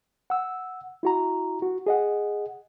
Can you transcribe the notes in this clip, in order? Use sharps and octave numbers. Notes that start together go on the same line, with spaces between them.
F#5 E6
E4 F#4 A#5
F#4
G#4 D#5 F#5